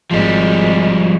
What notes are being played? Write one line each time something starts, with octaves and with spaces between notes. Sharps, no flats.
G#1 F3 G3 G#3